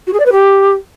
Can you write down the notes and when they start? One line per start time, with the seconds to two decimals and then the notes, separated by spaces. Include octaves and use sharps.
0.07 F#4
0.13 G#4
0.20 D5
0.26 B4
0.32 G4